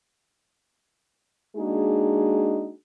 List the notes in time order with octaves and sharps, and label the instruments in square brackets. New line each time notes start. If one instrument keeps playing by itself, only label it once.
[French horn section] G#3 A#3 D4 D#4 F#4 G#4